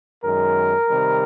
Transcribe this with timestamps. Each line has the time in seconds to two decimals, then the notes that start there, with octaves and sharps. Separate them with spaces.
0.23 F#2 D#3 G#3 A#4
0.88 C3 D#3 G3